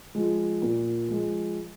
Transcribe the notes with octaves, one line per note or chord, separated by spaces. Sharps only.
F3 G#3
A#2
F3 G#3